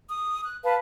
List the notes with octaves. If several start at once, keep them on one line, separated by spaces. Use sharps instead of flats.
D#6
F#6
B4 F5 A5